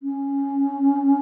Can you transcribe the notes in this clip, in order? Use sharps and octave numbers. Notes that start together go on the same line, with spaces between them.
C#4